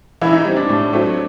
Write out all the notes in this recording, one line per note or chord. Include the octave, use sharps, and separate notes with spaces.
E3 E4
D#4
G3 C4
D4
A2
F#3 A3 C4